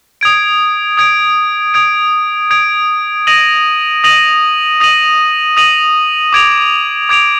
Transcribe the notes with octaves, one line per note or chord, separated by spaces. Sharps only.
D#6 G#6 D7
D#6 G#6 D7
D#6 G#6 D7
D#6 G#6 D7
D#6 A#6 D#7 F#7
D#6 A#6 D#7 F#7
D#6 A#6 D#7 F#7
D#6 A#6 D#7 F#7
D6 G#6 D7 F7
D6 G#6 D7 F7